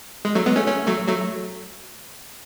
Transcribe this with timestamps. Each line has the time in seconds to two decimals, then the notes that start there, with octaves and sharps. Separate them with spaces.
0.25 G#3
0.35 F#3 A3
0.46 G#3 B3
0.56 A3 C#4
0.66 A3 C#4
0.87 F#3 A3
1.08 F#3 A3